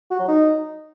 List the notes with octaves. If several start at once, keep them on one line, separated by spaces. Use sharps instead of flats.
F#4
F#3
D#4